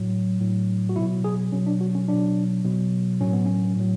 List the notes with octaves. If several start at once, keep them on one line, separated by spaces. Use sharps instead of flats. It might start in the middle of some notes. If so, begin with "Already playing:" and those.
Already playing: A2 F#3
A2 F#3
F#4
B2 F#3 E4
G#4
B2 F#3 C#4
D4
F#4
C#4
B2 F#3 D4
B2 F#3
A2 F#3 C#4
B3
C#4
A2 F#3